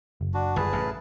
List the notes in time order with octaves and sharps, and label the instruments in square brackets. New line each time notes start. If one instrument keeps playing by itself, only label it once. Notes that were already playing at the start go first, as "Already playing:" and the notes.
[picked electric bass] F#1
[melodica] D4 F#4
[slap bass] G1 [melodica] G#4 B4 A5
[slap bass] A1 F#2